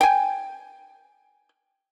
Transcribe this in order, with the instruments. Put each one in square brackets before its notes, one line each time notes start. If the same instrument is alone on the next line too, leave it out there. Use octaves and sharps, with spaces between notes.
[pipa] G5 G#5